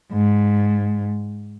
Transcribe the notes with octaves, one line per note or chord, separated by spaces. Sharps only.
G#2